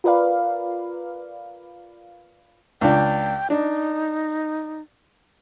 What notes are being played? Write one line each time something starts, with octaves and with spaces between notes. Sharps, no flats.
F4 A#4 B4 D5 F5
C#2 D4 G5
D4 D#4